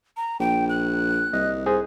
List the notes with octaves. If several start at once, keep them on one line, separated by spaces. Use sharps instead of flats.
A#5
A#1 G5
F#6
C2 D#5
G#4 C5